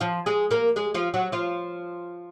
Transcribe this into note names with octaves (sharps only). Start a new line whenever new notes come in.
F3 F4
G#3 G#4
A#3 A#4
G#3 G#4
F3 F4
F#3 F#4
F3 F4